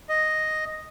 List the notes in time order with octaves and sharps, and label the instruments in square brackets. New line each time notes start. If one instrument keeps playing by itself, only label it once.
[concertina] D#5